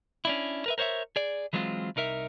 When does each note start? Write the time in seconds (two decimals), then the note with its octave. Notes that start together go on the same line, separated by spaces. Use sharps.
0.25 C#4 D4 E4
0.66 A#4 B4 E5
0.78 A#4 C5 C#5 D#5 E5
1.16 G#4 D5
1.53 E3 F#3 G#3 C4 F4
1.96 C2 D#4 A#4 E5